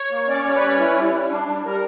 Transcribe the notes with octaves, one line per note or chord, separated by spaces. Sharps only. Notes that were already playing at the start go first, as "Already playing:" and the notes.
Already playing: C#5
A#3
C#4 D5
G3 C#5
B4
C#4
C#5
E4
G3
G3
D4
G3
G3 A#4